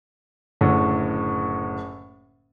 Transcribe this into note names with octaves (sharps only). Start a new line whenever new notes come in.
F#1 A2 D3